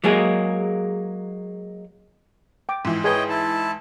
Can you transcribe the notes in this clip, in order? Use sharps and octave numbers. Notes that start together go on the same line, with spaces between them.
F#3 G#3 A#3 G#4
G5 D6
G#2 E3
G#4 B4 C#5 D#5 G5
E4 A5